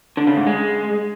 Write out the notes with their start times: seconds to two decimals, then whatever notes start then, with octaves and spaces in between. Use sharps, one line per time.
0.17 D3
0.27 C#3
0.37 G#2
0.47 G#3